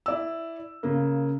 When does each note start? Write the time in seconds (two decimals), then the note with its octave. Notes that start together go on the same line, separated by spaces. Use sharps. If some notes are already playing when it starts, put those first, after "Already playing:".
0.06 E4 D5 E6
0.83 C#3 A#3